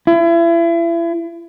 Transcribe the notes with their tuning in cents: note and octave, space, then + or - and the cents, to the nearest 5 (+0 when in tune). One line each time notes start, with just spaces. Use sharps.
E4 +35